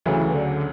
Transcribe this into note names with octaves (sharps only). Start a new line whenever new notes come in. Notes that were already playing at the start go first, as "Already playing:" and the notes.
D2 C#3 E3 F#3 A3
D3